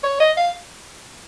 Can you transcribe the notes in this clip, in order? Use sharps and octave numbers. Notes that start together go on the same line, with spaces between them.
C#5
D#5
F5